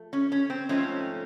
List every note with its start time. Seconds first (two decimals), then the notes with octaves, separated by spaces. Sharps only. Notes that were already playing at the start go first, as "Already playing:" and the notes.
Already playing: F3 A3
0.13 C#4
0.32 C#4
0.50 C4
0.69 G#2 F3 A3 C4 C#4